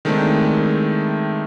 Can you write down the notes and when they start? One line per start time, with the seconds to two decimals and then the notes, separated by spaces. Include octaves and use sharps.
0.05 D#3 G#3 A3 C4 D4 E4